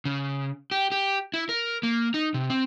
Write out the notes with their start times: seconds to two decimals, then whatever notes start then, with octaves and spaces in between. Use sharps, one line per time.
0.05 C#3
0.71 G4
0.92 G4
1.34 E4
1.49 A#4
1.83 A#3
2.14 D#4
2.34 C3
2.50 C4